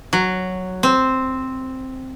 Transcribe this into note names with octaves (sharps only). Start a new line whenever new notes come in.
F#3
C4